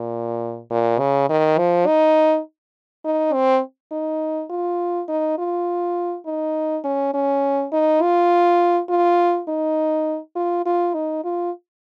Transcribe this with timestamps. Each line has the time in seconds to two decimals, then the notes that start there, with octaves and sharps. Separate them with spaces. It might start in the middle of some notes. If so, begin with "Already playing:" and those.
Already playing: A#2
0.70 A#2
0.99 C#3
1.29 D#3
1.58 F3
1.87 D#4
3.05 D#4
3.34 C4
3.91 D#4
4.50 F4
5.08 D#4
5.38 F4
6.26 D#4
6.84 C#4
7.14 C#4
7.72 D#4
8.02 F4
8.89 F4
9.48 D#4
10.35 F4
10.66 F4
10.94 D#4
11.24 F4